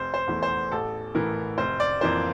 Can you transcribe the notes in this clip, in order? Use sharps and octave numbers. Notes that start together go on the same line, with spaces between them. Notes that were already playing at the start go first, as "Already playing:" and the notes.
Already playing: F1 C5
C5
E2 E3 A3
C5
A1 A4
A2 E3 A#4
F1 C5
D5
F2 E3 A#3 C5